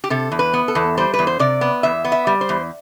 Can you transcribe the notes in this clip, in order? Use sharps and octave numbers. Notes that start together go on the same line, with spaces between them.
G4
C3 A4
E2
B4
B3
A4
E2
G3 C5
B4
E2
C5
C3 D5
B3
E2 E5
B3
E5
G3
C5
E2